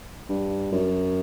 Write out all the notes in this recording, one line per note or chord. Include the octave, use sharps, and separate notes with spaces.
G2
F#2